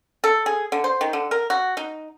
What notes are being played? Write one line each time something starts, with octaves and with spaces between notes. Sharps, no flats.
A4
G#4
D3
C5
D#3
D3
A#4
F#4
D#4